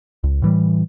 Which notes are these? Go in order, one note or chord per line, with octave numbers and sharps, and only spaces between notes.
C#2
A2 E3 G3